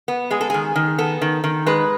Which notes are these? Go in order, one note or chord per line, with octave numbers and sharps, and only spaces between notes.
B3
G#3 G#4
A4
D#3 G#4
D#3
B3 A4
D#3
D#3
G#3 B4